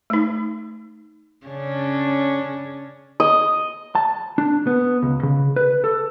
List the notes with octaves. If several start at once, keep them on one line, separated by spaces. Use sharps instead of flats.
A3 D#4
C#3 C#4 D4
D#5
A5
D4
B3
C#2
C#3
B4
A4